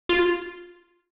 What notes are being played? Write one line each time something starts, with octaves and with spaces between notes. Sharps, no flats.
F4